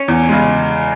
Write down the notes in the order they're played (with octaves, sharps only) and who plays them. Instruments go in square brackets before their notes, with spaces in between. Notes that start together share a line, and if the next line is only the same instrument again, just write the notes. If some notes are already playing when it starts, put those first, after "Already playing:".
Already playing: [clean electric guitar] C#4
[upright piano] E2
C#3 G#3